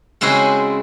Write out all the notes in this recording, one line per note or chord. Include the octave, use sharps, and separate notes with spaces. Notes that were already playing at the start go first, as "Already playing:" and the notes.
C#3 G#3 C4 E4 F#4 C5